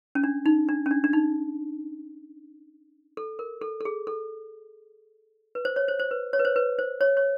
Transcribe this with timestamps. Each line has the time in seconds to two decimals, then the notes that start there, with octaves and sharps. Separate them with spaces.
0.15 C#4
0.24 D4
0.46 D#4
0.69 D4
0.86 C#4
0.91 D4
1.04 D4
1.13 D#4
3.17 A4
3.39 A#4
3.62 A4
3.81 A4
3.85 G#4
4.07 A4
5.55 B4
5.65 C5
5.76 C#5
5.88 C5
5.99 C5
6.11 B4
6.33 C#5
6.39 B4
6.45 C5
6.56 B4
6.79 C5
7.01 C#5
7.17 C#5